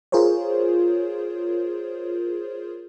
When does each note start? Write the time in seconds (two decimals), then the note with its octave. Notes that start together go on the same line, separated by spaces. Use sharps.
0.12 F4 G#4 A#4 C5 C#5